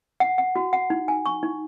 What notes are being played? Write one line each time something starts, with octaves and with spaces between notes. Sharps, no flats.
F#5
F#5
F#4
F#5
D#4
G#5
C#6
D#4